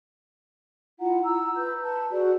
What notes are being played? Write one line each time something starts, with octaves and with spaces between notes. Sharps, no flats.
E4 F4 F#5 A#5
A#5 E6
B4 G6
B4 A5
F#4 G#4 D5